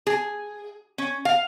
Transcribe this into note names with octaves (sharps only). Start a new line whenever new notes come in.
G#4
C#4
F5